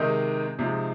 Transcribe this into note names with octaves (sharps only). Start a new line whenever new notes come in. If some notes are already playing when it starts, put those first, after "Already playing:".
Already playing: C3 D#3 G#3 D#4
C3 F3 G#3 D#4